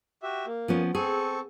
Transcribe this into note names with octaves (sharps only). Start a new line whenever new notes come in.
F#4 G4 E5
A#3
F3 B3 C#4
C4 G#4 A4 C#6